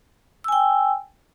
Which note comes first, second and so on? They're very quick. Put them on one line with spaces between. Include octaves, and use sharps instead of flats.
E6 G#5 G5